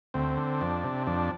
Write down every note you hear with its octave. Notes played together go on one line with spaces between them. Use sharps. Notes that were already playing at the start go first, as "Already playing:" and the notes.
D2 C4
D3
F2 D4
C3
F2 D4